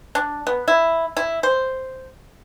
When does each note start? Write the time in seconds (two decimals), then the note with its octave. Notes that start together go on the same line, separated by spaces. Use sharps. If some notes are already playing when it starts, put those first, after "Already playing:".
0.15 D4
0.47 B3
0.68 E4
1.17 E4
1.43 C5